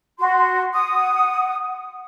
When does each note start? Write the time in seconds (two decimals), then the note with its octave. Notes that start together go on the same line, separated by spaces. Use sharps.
0.19 F#4 C6
0.73 F#5 D#6